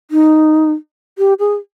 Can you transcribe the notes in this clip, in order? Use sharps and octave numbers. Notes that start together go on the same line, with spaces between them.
D#4
G4
G#4